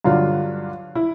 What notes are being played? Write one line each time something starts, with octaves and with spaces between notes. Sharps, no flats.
G2 D3 F#3 F4
E4